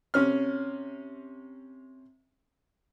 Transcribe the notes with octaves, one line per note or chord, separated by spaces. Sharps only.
C3 C#4 F6